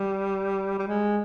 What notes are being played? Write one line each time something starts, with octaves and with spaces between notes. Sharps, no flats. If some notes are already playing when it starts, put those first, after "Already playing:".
Already playing: G3
G3
G#3